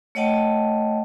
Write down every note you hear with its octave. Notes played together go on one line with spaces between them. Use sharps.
A3 C#5 D#5 F#5 G5 A5